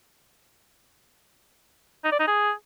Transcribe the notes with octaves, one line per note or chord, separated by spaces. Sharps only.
D#4
D5
D#4
G#4